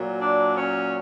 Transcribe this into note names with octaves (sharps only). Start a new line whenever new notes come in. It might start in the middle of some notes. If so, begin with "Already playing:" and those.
Already playing: A#2 F#3
D4
C#4